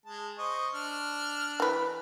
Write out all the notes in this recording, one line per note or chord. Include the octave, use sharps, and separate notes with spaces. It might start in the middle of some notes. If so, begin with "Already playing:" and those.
G#3 A5
C5 D#5 C#6
D4 F6
E3 B4